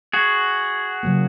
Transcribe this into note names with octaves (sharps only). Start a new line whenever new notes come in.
F#4 G#4
C#3 F#3 A#3